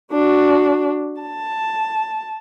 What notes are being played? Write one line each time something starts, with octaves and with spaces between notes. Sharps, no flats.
D4 F#4
A5